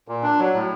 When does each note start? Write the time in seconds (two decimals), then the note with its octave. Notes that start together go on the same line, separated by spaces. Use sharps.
0.08 A#2
0.23 D4
0.39 F#3
0.54 A2